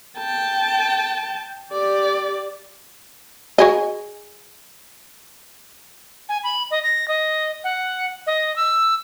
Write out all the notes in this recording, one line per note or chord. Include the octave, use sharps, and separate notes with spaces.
G5 A5
G4 D5
F#4 G#4 D#5
G#5
B5
D#5
A#6
D#5
F#5
D#5
E6